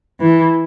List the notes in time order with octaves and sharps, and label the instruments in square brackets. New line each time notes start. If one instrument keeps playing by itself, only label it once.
[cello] E3